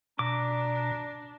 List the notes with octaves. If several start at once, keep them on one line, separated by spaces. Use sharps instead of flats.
B2 D4 A#5 D6